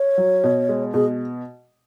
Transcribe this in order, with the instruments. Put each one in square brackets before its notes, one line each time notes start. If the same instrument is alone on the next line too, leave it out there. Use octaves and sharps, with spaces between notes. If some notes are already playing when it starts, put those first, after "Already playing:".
Already playing: [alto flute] C#5
[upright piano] F#3
B2
G#3
[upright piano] B2 [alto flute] G#4